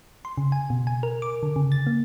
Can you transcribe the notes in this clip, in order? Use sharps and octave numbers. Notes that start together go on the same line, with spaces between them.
C6
C#3
G#5
B2
G#5
A#4
D6
D3
C#3
A6
A#3